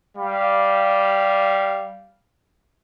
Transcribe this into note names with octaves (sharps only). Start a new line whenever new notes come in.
G3 F5